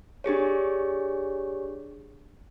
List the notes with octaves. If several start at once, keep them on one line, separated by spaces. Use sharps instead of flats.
D4 G4 G#4 C#5